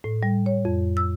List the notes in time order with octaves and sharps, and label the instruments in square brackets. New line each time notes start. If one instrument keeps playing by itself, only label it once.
[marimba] A2
G3
C#5
F2
E6